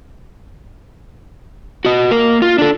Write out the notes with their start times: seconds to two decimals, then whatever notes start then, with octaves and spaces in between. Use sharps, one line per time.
1.85 F#4 D#5
2.11 A#3 A#4
2.42 F4
2.58 D4 A4